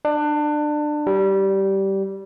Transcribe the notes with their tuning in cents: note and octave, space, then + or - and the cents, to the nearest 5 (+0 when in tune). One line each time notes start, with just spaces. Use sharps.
D4 +25
G3 -15